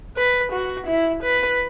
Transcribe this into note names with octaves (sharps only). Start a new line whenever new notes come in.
B4
F#4
E4
B4